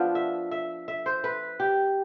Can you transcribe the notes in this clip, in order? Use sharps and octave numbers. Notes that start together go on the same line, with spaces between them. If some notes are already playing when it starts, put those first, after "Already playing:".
Already playing: F3 B3 D4 F4
E5
E5
E5
C5
B4
G4